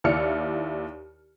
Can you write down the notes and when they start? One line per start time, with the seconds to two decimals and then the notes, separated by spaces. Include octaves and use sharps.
0.04 D#2 E4 D5 F6 C#7